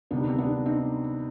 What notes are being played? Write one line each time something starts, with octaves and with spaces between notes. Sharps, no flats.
D2 C3 D#3 G3 B3 D4
C4
B3 D4
C4 D#4